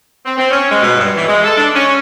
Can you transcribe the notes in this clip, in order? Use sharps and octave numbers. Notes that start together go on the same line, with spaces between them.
C4
C4
C#4
G#3
B2
G2
E3
G#3
A4
D4
C#4